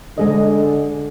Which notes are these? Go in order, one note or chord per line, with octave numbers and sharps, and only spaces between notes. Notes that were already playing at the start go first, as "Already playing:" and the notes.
D3 G#3 G#4 D#5